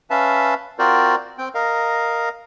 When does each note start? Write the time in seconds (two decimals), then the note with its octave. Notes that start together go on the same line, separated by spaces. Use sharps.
0.10 C#4 B4 E5 F5 A5
0.79 C4 F4 F#4 A#4 C5 D5
1.38 C4 G5
1.55 A#4 D#5 F5